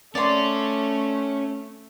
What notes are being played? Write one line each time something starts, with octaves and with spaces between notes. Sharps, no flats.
A3 C#4 D5 C6